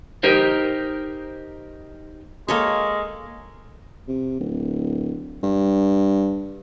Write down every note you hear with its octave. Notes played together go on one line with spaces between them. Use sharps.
D#4 G4 A#4 C5
G#3 A#3 A4 C#5
C3
D1
G2